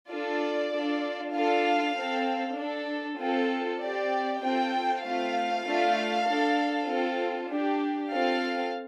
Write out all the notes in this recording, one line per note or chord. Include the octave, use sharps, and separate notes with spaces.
D4 F4 A4 D5
D4 F4 A4
D4 F4 A4 F5
C4 A4
D4 A4
C4 F4 A4
C4 G4 D5
C4 F4 A4 G5
A3 C4 F4 F5
A3 D4 F4 A4
D4 A4
C4 F4 A4
D4 G4
C4 F4 A4 F5